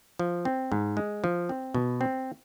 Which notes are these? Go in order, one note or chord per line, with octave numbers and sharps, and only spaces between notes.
F3
C4
G#2
G#3
F3
C4
B2
C4